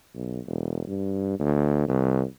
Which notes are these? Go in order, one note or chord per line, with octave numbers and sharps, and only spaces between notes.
B1
E1
G2
D2
C2